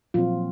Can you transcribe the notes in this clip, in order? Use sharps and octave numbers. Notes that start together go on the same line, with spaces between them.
A#2 F3 F#3 C4 F4